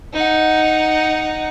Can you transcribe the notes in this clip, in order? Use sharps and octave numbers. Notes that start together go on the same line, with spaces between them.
D#4 F#5